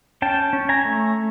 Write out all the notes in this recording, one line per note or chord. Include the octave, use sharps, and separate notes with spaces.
C#4 G5 A5
C#4
G#5 A#5
A3